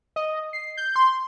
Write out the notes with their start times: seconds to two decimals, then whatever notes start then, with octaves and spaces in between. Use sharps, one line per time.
0.16 D#5
0.53 C7
0.77 G6
0.96 C6